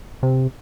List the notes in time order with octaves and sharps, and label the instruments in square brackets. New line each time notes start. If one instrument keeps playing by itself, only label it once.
[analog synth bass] C3